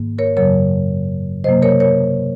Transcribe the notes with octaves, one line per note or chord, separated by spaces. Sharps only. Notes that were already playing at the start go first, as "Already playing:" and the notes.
Already playing: G#2 D#3 A#3
A#4 C#5
F#2 C#3 F#3 A#4 C#5
C3 F#3 A#3 C5 D#5
A#4 C#5
A#4 C#5